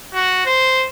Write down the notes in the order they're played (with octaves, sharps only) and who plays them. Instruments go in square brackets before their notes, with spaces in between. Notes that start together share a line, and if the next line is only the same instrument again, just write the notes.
[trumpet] F#4
C5